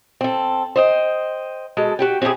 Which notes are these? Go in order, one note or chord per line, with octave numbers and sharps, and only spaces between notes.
C4 A4
C5 D#5 G5
B2 G#3 A4
F#4 G4 G5
C4 C#4 E4 G4 G#4